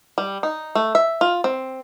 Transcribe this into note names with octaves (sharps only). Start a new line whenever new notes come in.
G3
D#4
A3
E5
F4
C4